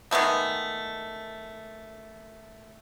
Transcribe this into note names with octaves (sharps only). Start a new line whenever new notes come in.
D#3 G#3 A3 B3